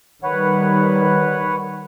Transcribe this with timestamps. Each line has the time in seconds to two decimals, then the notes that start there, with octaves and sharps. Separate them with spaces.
0.24 D#3 G3 B4 C#5 F#5